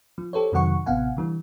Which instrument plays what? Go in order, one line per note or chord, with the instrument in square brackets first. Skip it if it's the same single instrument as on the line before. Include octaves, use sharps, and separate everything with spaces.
[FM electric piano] F3
G4 A4 C5 C#5
F2 C3 D#3 F#3 F#5 C#6
A1 C3 B3 F5 F#5 G#5
D3 E3 G3